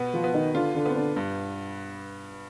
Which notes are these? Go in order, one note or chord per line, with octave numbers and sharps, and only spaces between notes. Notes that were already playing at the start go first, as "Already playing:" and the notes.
Already playing: B2 B3
F3 F4
B3
D#3 D#4
D3 D4 F4
D3 D4
B3 C4
D3 D4
G2